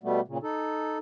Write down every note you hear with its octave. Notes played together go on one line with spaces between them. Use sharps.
B2 G3 A3 B3
A#2 C#3
D#4 A4